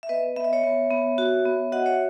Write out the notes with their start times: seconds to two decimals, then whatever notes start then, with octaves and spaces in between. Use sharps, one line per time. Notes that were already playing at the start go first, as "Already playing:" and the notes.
0.03 E5
0.09 B3 B4 D#5
0.36 B3 E5
0.44 D#5
0.53 C#5 E5
0.64 B3
0.91 B3
1.18 F#4
1.45 B3
1.72 F#4 D#5 F#5
1.86 C#5 E5